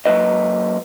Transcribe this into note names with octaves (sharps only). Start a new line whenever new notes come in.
F#3 A#3 B4 D#5